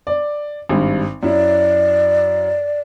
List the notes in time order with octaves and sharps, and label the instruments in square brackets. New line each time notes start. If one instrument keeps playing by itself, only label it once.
[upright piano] D5
G#1 G2
[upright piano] F#2 E4 [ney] D5